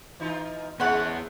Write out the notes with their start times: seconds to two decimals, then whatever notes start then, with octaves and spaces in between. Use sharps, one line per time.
0.20 E3 D#4 F4
0.80 G#3 B3 C#4 E4 C5 F#5